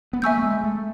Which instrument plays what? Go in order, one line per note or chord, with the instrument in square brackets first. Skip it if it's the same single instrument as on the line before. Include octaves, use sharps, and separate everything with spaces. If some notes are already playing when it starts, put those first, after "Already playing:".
[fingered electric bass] B3
[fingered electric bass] A#3 [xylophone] E5 G#5 C#6 E6 G6
[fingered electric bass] A3
G#3
A3